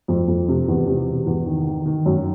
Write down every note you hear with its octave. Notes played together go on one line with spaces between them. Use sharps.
F2
F2
C3
E2
C3
E1
E2
D#3
D#3
D#3
F#2